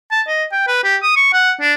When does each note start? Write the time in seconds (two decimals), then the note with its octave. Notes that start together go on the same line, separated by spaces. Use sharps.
0.11 A5
0.28 D#5
0.52 G5
0.67 B4
0.84 G4
1.03 D#6
1.16 C#6
1.33 F#5
1.61 D4